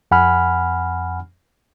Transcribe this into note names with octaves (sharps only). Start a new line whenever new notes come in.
F2 F#5 G#5 B5 F6